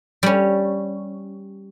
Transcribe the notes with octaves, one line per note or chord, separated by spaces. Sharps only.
G3 C#4